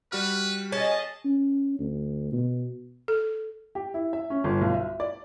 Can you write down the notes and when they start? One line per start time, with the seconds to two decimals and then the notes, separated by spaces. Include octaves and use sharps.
0.12 G3 F#4 B4 F6
0.72 C#4 G#4 D#5 A5
1.25 C#4
1.79 D2
2.32 B2
3.08 A4
3.75 G4
3.94 E4
4.13 E5
4.30 C#4
4.44 G1
4.61 B1
4.74 E5
5.00 D5